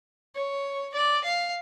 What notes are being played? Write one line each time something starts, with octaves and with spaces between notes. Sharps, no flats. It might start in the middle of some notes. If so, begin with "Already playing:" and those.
C#5
D5
F5